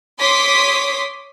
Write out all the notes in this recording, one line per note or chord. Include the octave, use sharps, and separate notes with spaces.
C#5 C6 D6 D#6 B6